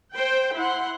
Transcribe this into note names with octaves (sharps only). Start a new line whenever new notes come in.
C5 G5
E4 F#5 C6